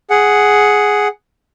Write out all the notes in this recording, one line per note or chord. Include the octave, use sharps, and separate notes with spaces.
G#4 F#5